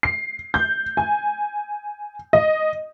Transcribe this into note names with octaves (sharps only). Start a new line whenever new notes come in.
C7
G6
G#5
D#5